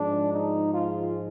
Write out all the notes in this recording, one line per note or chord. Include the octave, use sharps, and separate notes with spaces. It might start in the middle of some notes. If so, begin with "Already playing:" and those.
Already playing: G#2 F3 G#3 D4
D#4
F4